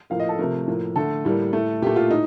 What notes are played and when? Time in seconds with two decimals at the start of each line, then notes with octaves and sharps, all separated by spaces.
0.10 A2 F3 A#3 F5
0.20 D#5
0.29 A4
0.39 C3 F3 A3 A#4
0.68 A2 F3 A#3
0.96 D3 A3 A4
1.25 A2 G3 A#3
1.53 A2 A3
1.82 A#2 A3 G4
1.96 F4
2.10 A2 D#4